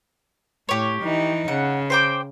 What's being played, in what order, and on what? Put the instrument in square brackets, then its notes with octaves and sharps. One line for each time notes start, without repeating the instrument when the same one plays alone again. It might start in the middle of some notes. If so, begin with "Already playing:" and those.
[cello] A2 [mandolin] G4 C#5
[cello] E3 D#4
[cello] C#3 [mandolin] F#5
[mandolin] C5 G5 D6